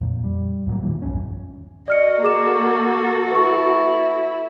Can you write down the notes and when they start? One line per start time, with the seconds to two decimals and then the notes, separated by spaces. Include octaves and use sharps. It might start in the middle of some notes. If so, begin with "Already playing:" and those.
0.01 F2 A#2
0.24 G3
0.66 D#2 A2 F#3 A#3
0.83 A#2 D#3 F3 G3
1.02 B1 E2 G2 C#4
1.88 F#4 A4 D5 D#5 F6 C#7
2.23 A#3 G#4 D6 E7
3.32 E4 B4 C#6